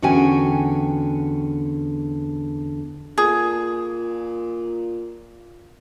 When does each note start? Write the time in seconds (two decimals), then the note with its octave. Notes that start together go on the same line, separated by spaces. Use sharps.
0.02 E2 D3 C#4 F#4 G5 G#5
3.18 A#2 G#4